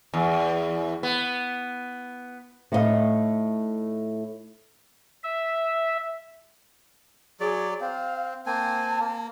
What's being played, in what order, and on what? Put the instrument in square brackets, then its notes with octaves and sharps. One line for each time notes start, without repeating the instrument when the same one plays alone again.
[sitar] E2
B3
[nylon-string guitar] A2 A3 D#4 F4 D#5 F5
[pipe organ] E5
[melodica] F#3 D5 [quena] G#4
[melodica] C4 [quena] F5
[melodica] A#3 C4 G#5 [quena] A5
[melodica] A#3